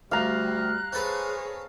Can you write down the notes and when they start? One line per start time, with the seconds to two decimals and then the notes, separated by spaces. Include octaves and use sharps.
0.12 D2 G3 F5 A#5 F#6
0.93 C4 G#4 A4 B4 C#5